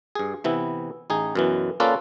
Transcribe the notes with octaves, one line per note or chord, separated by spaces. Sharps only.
G2 G#4
C3 E3 B3 E4
A1 D#4 G#4
F#2 B2 E3
A#3 C#4 F4 A4 B4 D5